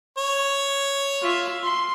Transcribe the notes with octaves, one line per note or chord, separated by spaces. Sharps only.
C#5
F4 E5
C6